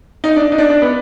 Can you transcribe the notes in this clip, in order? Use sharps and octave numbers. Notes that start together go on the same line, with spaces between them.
D#4
D4
D#4
D4
D4
B3